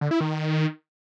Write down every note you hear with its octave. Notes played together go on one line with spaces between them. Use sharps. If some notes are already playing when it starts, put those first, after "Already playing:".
D3
E4
D#3